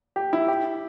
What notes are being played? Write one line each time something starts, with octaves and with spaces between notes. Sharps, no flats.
G4
E4
G4